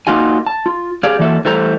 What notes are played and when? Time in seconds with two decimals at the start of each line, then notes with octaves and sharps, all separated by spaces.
0.07 A#3 D#4 F4 F#4 G#5
0.47 A5
0.66 F4
1.03 G4 G#4 D5 F5
1.19 E3 F#3 A#3 A4 E5
1.45 E3 G3 A3 A4 C5 A#5